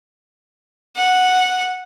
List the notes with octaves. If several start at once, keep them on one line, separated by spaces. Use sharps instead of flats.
F#5